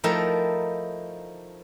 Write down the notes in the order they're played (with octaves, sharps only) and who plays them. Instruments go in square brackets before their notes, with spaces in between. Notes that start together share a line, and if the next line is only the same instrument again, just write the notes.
[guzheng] F3 A3 D#4 E4 A#4 G5